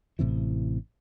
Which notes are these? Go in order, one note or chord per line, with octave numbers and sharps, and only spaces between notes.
A1 A2 C3 E3